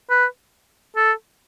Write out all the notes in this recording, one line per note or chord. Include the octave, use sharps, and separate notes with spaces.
B4
A4